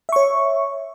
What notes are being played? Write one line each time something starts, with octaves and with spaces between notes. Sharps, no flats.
C#5 E5 C#6